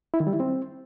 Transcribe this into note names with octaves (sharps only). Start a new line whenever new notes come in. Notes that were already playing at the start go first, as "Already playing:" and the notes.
E4
D#3
G3
E4
C4